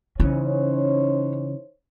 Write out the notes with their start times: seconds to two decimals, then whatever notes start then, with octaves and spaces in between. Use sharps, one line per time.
0.20 C#3 E3 C#4 D#4 C5 C#5